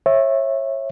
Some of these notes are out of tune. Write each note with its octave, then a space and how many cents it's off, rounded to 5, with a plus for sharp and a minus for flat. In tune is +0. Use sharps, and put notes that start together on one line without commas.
C#5 -25 E5 +0